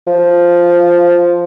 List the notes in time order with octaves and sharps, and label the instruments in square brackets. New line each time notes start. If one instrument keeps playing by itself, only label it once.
[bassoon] F3